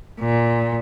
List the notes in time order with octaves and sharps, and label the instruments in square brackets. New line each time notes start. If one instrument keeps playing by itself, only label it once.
[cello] A#2